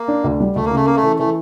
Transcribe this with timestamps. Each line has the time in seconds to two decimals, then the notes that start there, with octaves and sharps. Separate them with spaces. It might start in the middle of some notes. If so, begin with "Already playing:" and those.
Already playing: A#3
0.08 D4
0.24 D2
0.40 G3
0.55 D2 A3
0.66 A#3
0.71 C#3 A3
0.86 A#3 C#4
0.96 A3
1.03 E3
1.19 E3 A3